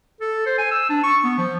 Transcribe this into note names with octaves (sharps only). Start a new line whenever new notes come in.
A4
C5
G#5
E6
D4
C#6
B3
F3